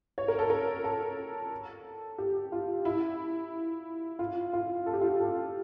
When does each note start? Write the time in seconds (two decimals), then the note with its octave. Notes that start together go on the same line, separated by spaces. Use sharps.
0.18 C#5
0.28 A#4
0.39 A4
0.50 A#4
0.84 A4
2.18 G4
2.52 F4
2.85 E4
4.19 F4
4.53 F4
4.86 A4
4.93 G4
5.01 F4
5.09 G4
5.20 A4